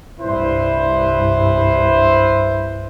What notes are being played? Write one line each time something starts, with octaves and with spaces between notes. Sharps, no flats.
C2 G2 E4 B4 C5